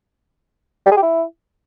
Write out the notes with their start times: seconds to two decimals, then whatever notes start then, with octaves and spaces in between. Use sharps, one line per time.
0.86 G3
0.91 G#4
0.97 G4
1.02 E4